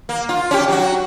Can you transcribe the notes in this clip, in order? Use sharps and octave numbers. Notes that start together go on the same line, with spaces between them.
A#3
F4
C#4 G4
F#3 F#4